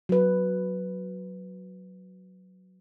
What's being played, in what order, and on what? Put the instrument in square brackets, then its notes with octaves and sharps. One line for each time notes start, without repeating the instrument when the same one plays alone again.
[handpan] F#3 B4